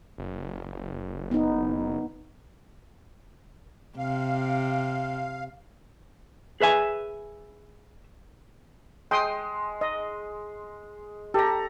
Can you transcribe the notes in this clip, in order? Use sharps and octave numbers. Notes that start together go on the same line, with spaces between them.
F#1
B3 D#4
C3 F5
G#4 B4 E5 G#5
G#3 G5 C6 D#6
D#5
G4 A4 A#5